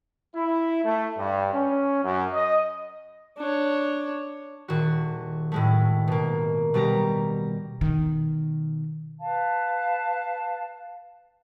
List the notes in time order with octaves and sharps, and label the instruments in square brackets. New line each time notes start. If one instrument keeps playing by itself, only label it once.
[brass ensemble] E4
A3
G2
C#4
F#2
D#5
[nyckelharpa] D4 C#5
[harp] D#1 F#4
A2 G#3 A3
B2 A#3
B2 G3 G4 A#5
[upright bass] B2 D#3
[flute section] B4 F5 A5